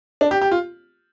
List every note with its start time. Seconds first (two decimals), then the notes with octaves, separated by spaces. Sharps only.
0.21 D4
0.31 G4
0.42 G4
0.51 F4